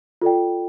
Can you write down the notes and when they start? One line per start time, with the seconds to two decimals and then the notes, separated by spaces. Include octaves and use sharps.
0.22 F4 A4 D5 G5